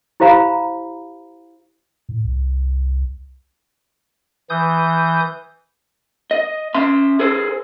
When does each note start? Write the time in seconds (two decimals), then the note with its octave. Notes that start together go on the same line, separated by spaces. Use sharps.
0.20 E4 G4 C5 F5 A#5 B5
2.09 A2
2.24 C2
4.50 E3 D#6 G6
6.31 D#5
6.74 C#4 E5 C6
7.19 G#4 A4 C5